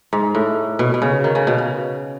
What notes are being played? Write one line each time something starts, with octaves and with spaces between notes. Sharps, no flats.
G#2
A2
B2
B2
C#3
D#3
C#3
B2
C#3